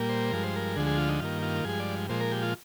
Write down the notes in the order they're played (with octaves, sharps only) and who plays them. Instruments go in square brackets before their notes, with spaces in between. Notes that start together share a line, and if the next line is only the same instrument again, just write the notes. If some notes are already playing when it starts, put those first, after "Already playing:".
Already playing: [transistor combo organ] A#2 G3 A#3
C5
G2 F3 G#3 A#4
C5
A#4
D2 D3 F3 G#3 G#4
G#4
F4
D#4
G2 D#3 A#3 F4
F4
G2 F3 G#3 G#4
D5
A#2 F3 G#3 C5
A#4
G4
F4